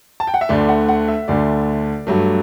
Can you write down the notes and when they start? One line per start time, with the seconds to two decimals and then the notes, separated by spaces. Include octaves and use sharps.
0.20 A5
0.27 G5
0.34 F#5
0.41 E5
0.49 D2 D3 A3 D5
0.69 F#5
0.88 F#5
1.08 E5
1.28 D2 D3 A3 D5
2.07 G2 F#3 A3